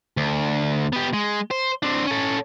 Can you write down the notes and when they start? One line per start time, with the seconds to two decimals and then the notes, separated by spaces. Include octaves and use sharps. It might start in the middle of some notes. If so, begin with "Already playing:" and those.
0.17 D2
0.93 B3 G4
1.14 G#3
1.51 C5
1.83 C4 D4
2.07 C#4 A4